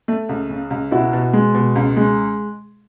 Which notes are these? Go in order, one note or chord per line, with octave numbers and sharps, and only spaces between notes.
A3
C#2
C#3
C#2
B2 E4 F#4
B2
G#3
B2
C#2
G#3